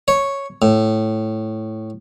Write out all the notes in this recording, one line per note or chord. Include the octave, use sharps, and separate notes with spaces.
C#5
A2